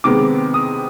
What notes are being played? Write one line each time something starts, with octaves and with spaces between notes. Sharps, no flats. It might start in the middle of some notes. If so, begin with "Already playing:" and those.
C3 D#3 G#3 B3 D6
D#6